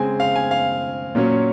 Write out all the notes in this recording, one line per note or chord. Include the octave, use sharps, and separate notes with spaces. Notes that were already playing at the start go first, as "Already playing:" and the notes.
Already playing: C#3 G#3 C4 G#5
F5
G#5
F5
A#2 F#3 C#4